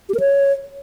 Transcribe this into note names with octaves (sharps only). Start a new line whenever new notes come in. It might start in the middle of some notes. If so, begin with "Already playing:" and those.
G4
A#4
C#5